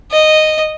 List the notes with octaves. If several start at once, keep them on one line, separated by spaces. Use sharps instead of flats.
D#5